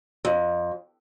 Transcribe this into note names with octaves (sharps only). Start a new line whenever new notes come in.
F2